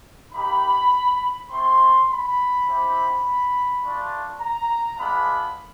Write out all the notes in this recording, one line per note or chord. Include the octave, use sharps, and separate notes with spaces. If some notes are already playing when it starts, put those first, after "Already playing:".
A#3 D#4 G4 B5
A3 C4 E4 C6
B5
C4 E4 G4
A3 D4 F4
A#5
G#3 B3 D4 F4 B5